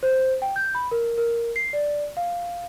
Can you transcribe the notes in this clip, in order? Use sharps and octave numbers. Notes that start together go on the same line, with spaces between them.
C5
G5
G6
B5
A#4
A#4
C7
D5
F5